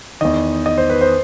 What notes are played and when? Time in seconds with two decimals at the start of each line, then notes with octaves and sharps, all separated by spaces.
0.21 E2 D#3 D#5
0.66 D#5
0.78 C5
0.90 B4
1.01 C5